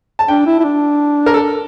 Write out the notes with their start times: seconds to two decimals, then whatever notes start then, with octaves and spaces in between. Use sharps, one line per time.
0.19 A5
0.28 D4 G5
0.46 E4
0.60 E4
0.64 D4
1.26 A#4
1.34 A4